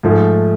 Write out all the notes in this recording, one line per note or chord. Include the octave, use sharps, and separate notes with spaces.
G#2 F3 A3